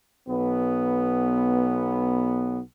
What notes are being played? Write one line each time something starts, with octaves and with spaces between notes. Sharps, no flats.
B1 B3